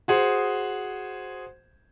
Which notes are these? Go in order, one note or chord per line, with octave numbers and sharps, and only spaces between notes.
F#4 G#4 C5